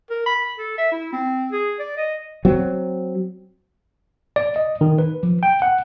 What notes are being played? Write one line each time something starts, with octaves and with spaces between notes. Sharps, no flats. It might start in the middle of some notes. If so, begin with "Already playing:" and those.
A#4
B5
A4
E5
E4
C4
G#4
D5
D#5
F#3 C4
D5
D#5
D#3
B4
F3
G5
F#5